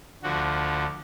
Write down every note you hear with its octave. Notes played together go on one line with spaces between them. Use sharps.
D2 D3 F3 F#4